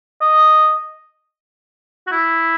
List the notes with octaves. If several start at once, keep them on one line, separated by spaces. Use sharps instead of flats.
D#5
F#4
E4